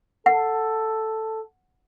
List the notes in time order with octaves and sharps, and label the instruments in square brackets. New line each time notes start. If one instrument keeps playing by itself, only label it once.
[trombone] A4 [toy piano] F#5